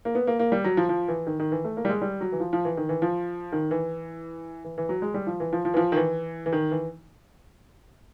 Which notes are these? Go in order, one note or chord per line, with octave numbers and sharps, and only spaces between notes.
A#3
B3
A#3
A#3
G3
F#3
F3
F3
E3
D#3
D#3
E3
A3
A#3
G3
G#3
G3
F#3
E3
F3
F3
E3
D#3
E3
F3
D#3
E3
E3
E3
F#3
G#3
G3
F3
E3
F3
F3
E3
F3
D#3
E3
E3
D#3
E3